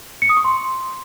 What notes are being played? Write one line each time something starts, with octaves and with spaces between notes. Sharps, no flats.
C#7
D#6
C#6
C6